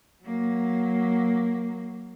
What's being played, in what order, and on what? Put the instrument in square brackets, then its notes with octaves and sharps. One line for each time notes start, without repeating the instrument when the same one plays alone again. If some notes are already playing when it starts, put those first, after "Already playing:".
[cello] F#3 A#3